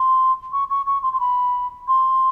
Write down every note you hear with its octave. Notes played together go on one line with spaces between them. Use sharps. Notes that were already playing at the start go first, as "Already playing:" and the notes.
Already playing: C6
C#6
C#6
C#6
C6
C6
B5
C6